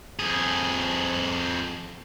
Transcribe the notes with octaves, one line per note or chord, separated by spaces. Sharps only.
F2 G#4